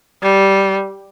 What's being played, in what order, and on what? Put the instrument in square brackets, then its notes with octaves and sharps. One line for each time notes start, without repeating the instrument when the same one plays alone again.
[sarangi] G3